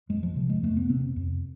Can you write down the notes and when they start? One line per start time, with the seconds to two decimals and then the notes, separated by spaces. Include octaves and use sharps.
0.09 F2 G#3
0.23 F3
0.36 C3
0.50 G#3
0.63 F2 A3
0.77 B3
0.89 C3 C4
1.16 F2